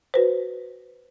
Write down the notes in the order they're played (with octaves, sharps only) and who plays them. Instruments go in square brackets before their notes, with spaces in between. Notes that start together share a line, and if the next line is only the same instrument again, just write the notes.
[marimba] F#4 B4 C5